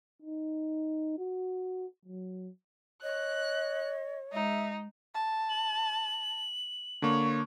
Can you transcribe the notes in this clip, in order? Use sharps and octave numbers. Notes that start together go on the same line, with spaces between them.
D#4
F#4
F#3
C#5 D#5 F#6
G#3 D#4 E5
A5
F#7
D3 A#3 C#5